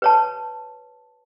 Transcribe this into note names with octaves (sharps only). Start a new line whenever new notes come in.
B4 C#5 A5